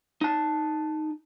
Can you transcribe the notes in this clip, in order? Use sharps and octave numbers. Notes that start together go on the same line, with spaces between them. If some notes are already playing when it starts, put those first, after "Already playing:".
D#4 A5